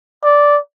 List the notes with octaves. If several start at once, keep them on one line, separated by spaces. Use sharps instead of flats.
D5